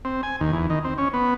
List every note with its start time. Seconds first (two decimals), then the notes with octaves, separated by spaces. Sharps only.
0.05 C4
0.23 G#5
0.41 D#2
0.53 E2
0.70 D#3
0.84 C4
0.98 C#4
1.14 B3